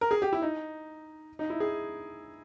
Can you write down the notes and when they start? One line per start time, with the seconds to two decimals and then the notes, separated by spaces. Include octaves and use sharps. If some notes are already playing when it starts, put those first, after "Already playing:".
0.01 A#4
0.11 G#4
0.22 G4
0.33 E4
0.42 D#4
1.39 D#4
1.50 E4
1.60 G#4